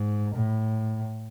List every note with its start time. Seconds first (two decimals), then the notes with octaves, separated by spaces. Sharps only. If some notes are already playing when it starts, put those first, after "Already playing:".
Already playing: G#2
0.34 A2